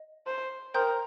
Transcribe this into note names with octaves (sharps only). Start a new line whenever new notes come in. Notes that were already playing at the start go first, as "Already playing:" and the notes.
Already playing: D#5
C5
A#4 C5 G5 C6 D#6 G6